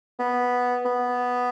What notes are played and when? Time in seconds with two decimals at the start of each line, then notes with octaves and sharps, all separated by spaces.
0.19 B3
0.85 B3